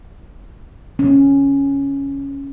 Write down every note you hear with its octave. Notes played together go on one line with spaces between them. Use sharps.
C#4